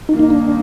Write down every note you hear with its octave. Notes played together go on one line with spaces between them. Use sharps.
G2 D#3 A#3 D#4
D#4
D4